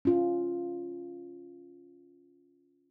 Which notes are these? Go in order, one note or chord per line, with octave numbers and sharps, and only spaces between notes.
C#4 F4